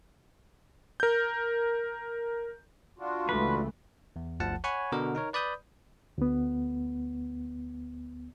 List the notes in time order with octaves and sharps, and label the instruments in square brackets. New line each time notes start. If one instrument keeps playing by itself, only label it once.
[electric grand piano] A#4 G6
[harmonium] D4 F4 F#4
[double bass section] C#2 E3 A3 [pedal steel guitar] B4
[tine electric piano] E2
G1 D2 F3 F#5 A5
C#5 F#5 G#5 B5 C#6
B2 D3 F#4 A#4
D#4 A#4 C#5
B4 D5 B5 D#6 G6
[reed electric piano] D2 B3